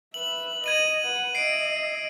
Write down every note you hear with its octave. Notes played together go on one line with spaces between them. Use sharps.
B4 E5 F#7
D#5 G#6 D#7 F#7
B4 F#5
D#5 E5 C7 D7